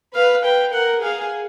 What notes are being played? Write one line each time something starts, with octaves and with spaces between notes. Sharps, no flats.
B4 F5
B4 G5
A#4 F#5
G#4 F5